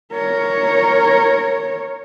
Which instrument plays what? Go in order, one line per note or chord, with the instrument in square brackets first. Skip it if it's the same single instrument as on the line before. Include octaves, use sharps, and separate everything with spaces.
[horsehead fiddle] A#4 C#5